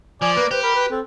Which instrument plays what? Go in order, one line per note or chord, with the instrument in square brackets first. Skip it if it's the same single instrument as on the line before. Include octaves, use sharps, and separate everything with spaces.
[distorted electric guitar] F3 [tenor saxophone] D5 [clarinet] G#5
[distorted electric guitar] A#3 [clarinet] B4
[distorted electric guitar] G4 [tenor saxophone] B4 [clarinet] C5
[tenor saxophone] A#4 [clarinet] B5
[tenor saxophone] B4
[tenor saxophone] C4 [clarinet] A4